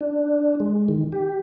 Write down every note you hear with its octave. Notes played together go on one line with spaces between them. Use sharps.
D4
G#3
D#3
G4